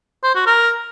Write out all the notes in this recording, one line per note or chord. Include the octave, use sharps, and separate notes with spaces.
C5
F#4
A#4